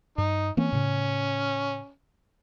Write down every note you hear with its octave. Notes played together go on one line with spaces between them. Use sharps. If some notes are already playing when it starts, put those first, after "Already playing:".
G2 D#4
E3 A#3 C4 C#4
A2 C#3